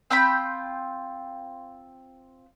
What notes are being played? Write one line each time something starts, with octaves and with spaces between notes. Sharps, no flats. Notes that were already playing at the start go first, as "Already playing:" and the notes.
C4 F4 G5 B5